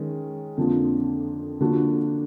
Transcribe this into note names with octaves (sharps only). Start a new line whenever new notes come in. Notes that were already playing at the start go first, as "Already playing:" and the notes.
Already playing: D#3 G#3 C#4
F2 D3 F3 A#3 D4
D3 F3 A#3 D4 F#4